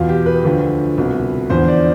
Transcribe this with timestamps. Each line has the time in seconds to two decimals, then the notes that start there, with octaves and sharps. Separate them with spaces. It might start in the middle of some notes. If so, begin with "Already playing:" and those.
Already playing: E2 B2 F4
0.09 G4
0.26 B4
0.44 D2 D3 F3
0.97 C2 B2
1.50 E2 D3 F3 C5
1.68 D5